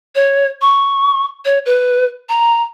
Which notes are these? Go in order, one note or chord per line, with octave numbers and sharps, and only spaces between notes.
C#5
C#6
C#5
B4
A#5